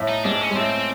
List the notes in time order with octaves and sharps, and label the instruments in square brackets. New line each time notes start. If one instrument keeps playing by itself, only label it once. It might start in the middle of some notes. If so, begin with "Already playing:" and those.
Already playing: [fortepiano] A2 A3
[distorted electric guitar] D#4
[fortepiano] G#2 G#3 [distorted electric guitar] D4
[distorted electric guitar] C#4
[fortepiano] G#3
[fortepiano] A2 A3 [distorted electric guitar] C4